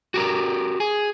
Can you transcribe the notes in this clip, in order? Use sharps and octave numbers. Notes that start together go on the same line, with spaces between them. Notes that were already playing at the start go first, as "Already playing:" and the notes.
F#4 G4 A#4
G#4